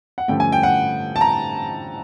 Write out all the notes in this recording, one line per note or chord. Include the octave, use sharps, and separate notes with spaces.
F#5
G2 D3 F3 A3 C#4 G5
G#5
G5
F#5
A5
A#5